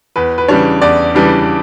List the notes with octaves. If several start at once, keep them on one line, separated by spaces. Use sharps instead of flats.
E2 B4
B4
C#3 E3 G3 D4 C#5
E2 D5
C#3 E3 G3 D4